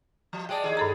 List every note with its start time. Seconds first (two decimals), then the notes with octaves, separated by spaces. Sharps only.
0.33 F3
0.49 G#3 G#4 D5 G5 A5
0.64 D#2 D#3 G#4 D#5
0.77 G2 A4 A#5